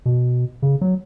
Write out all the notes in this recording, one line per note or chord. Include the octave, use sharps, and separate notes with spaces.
B2
C#3
F#3